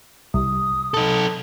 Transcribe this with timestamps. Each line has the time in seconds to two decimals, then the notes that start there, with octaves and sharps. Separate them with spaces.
0.34 C2 D#6
0.94 D#4 A4